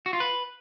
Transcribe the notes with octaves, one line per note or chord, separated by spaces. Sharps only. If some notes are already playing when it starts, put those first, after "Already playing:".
F#4
F4
B4